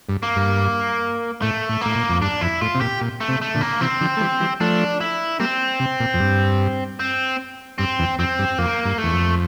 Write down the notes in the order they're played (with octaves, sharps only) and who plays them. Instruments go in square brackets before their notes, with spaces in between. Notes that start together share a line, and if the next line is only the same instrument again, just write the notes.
[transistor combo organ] G2
[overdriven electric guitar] A#3
[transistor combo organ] G2
[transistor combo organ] A2 [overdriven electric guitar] A3
[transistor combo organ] A2
[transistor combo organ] A2 [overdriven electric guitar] A#3
[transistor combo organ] A#2
F2
[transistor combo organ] G2 [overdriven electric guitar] D4
[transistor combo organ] F2 [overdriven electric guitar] E4
[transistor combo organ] A2 [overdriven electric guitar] F4
[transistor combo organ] C3
[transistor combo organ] A#2 [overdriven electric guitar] G4
[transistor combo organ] A#2
[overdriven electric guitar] A3
[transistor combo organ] C3
[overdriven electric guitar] A3
[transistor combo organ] A#2 D3
[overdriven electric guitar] A#3
[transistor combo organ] C3 E3 [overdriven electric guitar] C4
[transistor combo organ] D3 F3
A3
E3 G3
E3 G3
[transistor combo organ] F3 A3 [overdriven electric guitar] D4
[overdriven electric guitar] E4
[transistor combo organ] G3 A#3 [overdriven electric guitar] C4
[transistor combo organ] C3
A#2
F2
G2
[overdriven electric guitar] C4
[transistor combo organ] G2 [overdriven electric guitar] C4
[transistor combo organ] E2
[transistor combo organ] F2 [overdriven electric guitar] C4
[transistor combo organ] G2
[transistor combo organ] F2 [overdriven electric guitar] A#3
[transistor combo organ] G2
[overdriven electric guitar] A3
[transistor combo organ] E2
F2